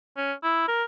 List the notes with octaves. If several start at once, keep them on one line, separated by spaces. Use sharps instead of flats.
C#4
E4
A#4